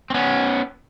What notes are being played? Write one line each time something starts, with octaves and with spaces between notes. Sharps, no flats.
C4
B3 C#4